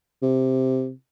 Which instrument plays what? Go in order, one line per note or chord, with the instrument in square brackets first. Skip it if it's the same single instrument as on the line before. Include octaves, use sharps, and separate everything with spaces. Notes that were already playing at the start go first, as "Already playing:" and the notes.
[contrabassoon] C3